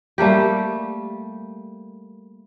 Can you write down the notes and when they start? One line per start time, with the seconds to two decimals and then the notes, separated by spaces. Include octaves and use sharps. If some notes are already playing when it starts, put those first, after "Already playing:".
0.18 G3 A3 A#3 G4